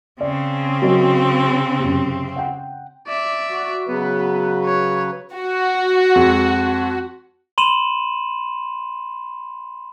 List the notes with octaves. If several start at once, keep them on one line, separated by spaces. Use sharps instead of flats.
C#3 C4 D5
F#3 A#4 D#5
F#2 C3
F#5 G5
D5 E5
F#4
C#3 F#3 B3 B4
C#5
F#4
F2 G#3
B5 C6 D#7 E7 F#7